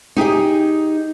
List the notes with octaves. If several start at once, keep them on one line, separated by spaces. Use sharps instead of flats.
D#4 G4 G#4 D#5